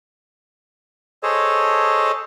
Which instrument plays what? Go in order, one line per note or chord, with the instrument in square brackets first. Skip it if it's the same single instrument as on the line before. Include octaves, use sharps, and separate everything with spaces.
[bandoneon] G#4 A4 C5 C#5 D#5 A5